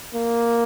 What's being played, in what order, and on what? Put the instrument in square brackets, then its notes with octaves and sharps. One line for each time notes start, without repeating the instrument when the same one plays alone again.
[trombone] A#3